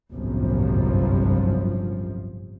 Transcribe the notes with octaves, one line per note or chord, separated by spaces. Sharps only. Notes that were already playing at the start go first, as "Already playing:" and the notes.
G1 C2 F#2 A2 F3